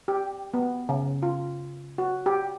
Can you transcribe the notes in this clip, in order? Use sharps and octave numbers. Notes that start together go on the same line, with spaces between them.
G4
B3
C#3
F4
F#4
G4